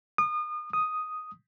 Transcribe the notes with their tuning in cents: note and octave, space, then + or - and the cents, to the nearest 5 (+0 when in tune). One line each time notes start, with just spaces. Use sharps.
D#6 -35
D#6 +0